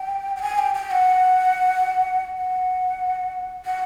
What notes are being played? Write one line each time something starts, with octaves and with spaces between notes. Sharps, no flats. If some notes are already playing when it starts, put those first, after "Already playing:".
Already playing: G5
G5
G#5
G5
G5
F#5
F#5
F#5